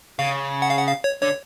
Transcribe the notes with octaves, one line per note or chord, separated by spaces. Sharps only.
C#3 F5
F#5
F5
F#5
F5
C#5
D3 C#5